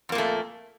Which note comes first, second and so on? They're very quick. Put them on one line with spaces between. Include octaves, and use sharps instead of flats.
F2 A#3 A#2 A3